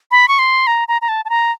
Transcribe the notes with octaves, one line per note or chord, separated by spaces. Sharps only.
B5
C#6
C6
A#5
A#5
A#5
A5
A5
A#5